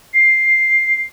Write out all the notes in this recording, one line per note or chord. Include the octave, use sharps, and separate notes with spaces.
C7